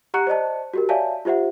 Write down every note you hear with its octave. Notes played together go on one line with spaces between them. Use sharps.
G4 F#5 A#5 C#6 F#6 C#7
C5 D5 D#5 A5
F#4 G4 A#4
C#5 D5 E5 F5 G#5 A5
F4 G4 C5 E5 F#5